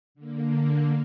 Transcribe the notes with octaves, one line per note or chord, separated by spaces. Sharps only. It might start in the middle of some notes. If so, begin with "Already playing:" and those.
D3 A#3